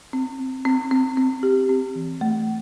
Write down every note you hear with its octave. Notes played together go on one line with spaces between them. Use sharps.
C4
C4
C4
C4
C4
G4
C4
E3
A3